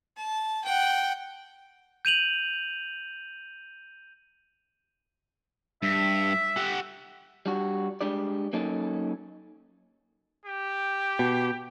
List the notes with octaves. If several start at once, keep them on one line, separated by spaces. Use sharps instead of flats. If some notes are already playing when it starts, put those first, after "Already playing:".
A5
F#5 G5
G6 D#7 F7 F#7
G2 E5
G4 F#5
G3 D4 F#4
G#3 D4 G4 D5
F#3 A#3 C#4 D#4 A4
G4
B2